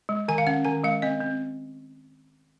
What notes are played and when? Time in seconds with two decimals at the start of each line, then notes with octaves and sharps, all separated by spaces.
0.09 G#3
0.28 D#3 G#5
0.38 F5
0.47 C#4 F#5
0.65 D#3 G#5
0.84 G#3 F5
1.02 C4 D#5
1.21 C4